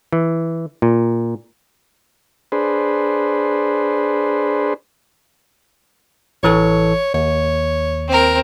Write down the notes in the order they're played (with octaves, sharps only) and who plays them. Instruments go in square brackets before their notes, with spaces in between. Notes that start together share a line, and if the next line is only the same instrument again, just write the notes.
[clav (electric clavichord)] E3
A#2
[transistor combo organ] D4 G#4 B4 C5
[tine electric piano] A1 E3 A4 [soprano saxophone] C#5
[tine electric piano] D#2 [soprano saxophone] C#5
[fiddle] C4 A#4